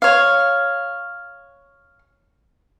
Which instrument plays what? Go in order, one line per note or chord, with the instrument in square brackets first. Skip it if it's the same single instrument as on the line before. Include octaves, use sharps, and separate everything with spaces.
[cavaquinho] C#5 F5